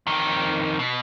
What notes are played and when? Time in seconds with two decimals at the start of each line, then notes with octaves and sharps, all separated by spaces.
0.07 F2 D#3
0.79 B2